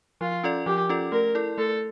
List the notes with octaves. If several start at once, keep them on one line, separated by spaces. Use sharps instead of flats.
F3 F4
C#4 F4 A4 D5
F3 G4
C#4 F4 A4 D5
A3 A#4
E4 A4 D5
A3 A4